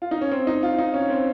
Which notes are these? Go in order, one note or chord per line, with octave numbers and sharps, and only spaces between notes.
F4
D#4
C#4
C4
D#4
F4
D#4
C#4
C4